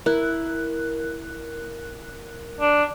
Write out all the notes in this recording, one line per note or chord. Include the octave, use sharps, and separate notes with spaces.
E4 A#4 F#6
D4